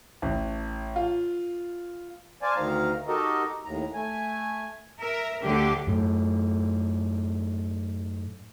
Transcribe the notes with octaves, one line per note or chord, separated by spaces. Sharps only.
A1
F4
C5 D5 F5 G#5 A5
D2 D#3 F5 A#5
D#4 F#4 G4 A4 A#4 D#5
D#2 A2 A#5
A3 G#5
A#4 E5
D2 D3 F#3 G4
F#2 A2